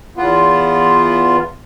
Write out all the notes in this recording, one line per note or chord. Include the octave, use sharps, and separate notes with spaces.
E2 B3 F4